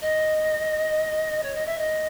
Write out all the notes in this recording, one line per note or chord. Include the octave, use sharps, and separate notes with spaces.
D#5
C#5
D#5
E5
D#5